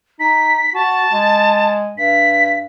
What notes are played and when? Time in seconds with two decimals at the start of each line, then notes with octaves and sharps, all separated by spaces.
0.20 D#4 B6
0.74 F#4 A5
1.12 G#3
1.98 G2 B6